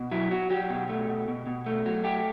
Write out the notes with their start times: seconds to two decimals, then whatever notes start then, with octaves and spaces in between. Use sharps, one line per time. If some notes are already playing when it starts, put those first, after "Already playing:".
Already playing: B2
0.11 F#3 E4
0.31 F#3 F#4
0.50 F#3 G4
0.70 B2
0.89 A3
1.08 B2
1.28 B2
1.47 B2
1.66 A3
1.86 F#3
2.04 A3 G4